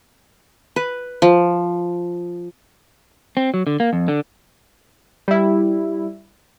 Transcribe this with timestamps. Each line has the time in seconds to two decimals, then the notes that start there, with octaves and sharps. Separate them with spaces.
0.76 B4
1.22 F3
3.37 C4
3.54 F#3
3.67 D3
3.80 A#3
3.93 F2
4.08 D3
5.28 G3 E4